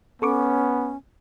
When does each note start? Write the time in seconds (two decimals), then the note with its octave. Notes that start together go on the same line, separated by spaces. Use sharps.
0.22 B3 C#4 A4 C#6 D6